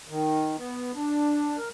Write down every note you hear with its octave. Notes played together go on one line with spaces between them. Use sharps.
D#3
B3
D4
A#4